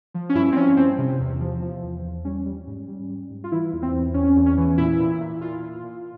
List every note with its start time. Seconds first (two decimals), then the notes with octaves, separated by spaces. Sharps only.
0.14 F3
0.29 C#4
0.35 G2 E4
0.52 C4
0.56 F3 C#4
0.77 G2 C4
0.98 C3
1.20 E2
1.40 F3
1.62 F3
1.83 E2
2.04 E2
2.25 G3 C#4
2.46 G3
2.67 G#2
2.88 G3
3.09 G3
3.30 G#2
3.44 F4
3.52 E3 E4
3.73 E2
3.82 C4
3.93 E2
4.14 E2 C#4
4.36 E2
4.46 C#4
4.57 E3
4.78 A#2 E4
5.00 A#2
5.21 A#2
5.41 A#2 F4
5.62 A#2
5.83 A#2